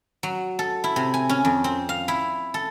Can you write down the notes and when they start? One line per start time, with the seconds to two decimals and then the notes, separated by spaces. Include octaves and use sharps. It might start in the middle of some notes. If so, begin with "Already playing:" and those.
0.23 F#3
0.59 A4
0.84 E4
0.96 C3
1.14 G#5
1.29 C#4
1.45 F2
1.64 C4
1.89 F5
2.08 E4
2.54 A4